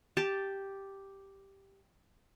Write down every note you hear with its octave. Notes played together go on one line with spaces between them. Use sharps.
G4 A5